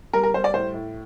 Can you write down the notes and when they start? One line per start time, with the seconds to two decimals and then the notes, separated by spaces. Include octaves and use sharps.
0.13 G3 A#4
0.23 A#4
0.34 G3 C5
0.44 D5
0.54 A2 C5
0.74 A2